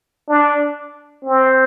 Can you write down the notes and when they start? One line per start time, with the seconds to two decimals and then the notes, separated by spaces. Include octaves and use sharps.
0.29 D4
1.25 C4